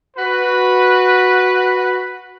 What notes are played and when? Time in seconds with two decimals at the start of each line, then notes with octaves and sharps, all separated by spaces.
0.17 F#4 B4